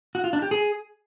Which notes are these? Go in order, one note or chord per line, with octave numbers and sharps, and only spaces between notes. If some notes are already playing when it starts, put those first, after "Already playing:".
F#4
F4
D4
G4
G#4